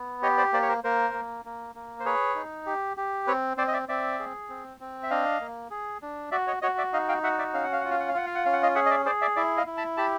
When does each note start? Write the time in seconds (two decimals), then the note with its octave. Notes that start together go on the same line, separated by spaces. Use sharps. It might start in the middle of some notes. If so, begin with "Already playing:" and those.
Already playing: B3
0.22 G4 C#5 D#5
0.37 C5 D5
0.53 A#3 C5 D5
0.62 C#5
0.69 A#4 C5
0.84 A#3 A#4 C5
1.14 A#3
1.45 A#3
1.75 A#3
2.00 C5
2.05 G#4 B4 C#5
2.35 D#4
2.66 G4
2.97 G4
3.27 C4 B4 C#5
3.57 C4 C5 D5
3.68 D#5
3.73 D5 E5
3.88 C4 D5 E5
4.19 G#4
4.49 C4
4.80 C4
5.03 E5
5.10 D4 D#5 F5
5.40 A#3
5.70 G#4
6.02 D4
6.31 F#4 D5 E5
6.47 C#5 D#5
6.62 F#4 C#5 D#5
6.78 D5 E5
6.93 D#4 D#5 F5
7.09 F5 G5
7.23 F#4 E5 F#5
7.38 D5 E5
7.53 C#4 F5
7.63 F#5
7.72 F5
7.81 F#5
7.85 F4
7.90 F5
8.00 F#5
8.08 F5
8.14 F4 F#5
8.26 F5
8.35 F#5
8.45 C#4 F5
8.53 F#5
8.63 D#5 F5
8.75 G#4 E5 F#5
8.86 D#5
8.90 D5 E5
9.06 G#4 C5 D5
9.21 D5 E5
9.36 E4 D5 E5
9.57 D#5 F5
9.66 E4
9.77 A5 B5
9.97 G4 A5 B5